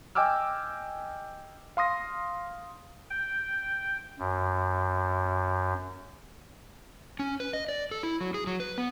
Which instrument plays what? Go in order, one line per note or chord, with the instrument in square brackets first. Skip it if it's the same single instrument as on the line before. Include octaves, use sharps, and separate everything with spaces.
[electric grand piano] D#5 G5 G#5 D6 E6 F6
F5 C6 D#6 A#6
[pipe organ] G5
F#2
[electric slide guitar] C#4
B4
D#5
D5
A4
E4
F#3
G#4
F#3
B4
B3